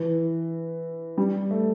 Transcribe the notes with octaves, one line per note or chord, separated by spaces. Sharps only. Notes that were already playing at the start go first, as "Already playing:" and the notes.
Already playing: E3
G3
A3